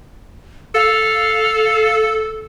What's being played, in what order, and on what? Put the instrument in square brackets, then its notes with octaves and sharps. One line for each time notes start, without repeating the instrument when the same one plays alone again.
[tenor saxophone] A4 [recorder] F5